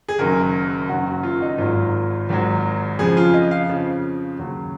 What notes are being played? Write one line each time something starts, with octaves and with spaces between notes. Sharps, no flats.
G#4
F#1 F#2 D#3 F#3 A#4
F#1 F#2 D#3 F#3 F#4
F#4
F4
D#4
G#1 G#2 D#3 F#3 F4
G#1 G#2 D#3 F#3
F2 C#3 F3 G#4
F4
D#5
F5
F2 C#3 F3
D#2 C#3 F#3